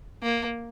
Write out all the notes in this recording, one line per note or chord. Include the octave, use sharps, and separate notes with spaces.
A#3